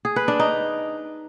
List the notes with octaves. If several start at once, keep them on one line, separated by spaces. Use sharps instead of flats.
G#4
B4
D4
D#4